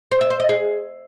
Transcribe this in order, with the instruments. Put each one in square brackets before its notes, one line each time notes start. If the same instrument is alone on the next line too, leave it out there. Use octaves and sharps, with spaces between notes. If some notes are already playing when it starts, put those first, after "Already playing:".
[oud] C5
E5
C5
D#5
G#4